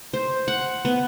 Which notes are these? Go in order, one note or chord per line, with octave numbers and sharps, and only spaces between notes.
C5
F#5
B3